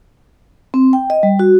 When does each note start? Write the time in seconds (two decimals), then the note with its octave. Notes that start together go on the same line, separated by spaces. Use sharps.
0.74 C4
0.93 G5
1.10 D#5
1.23 G3
1.39 F#4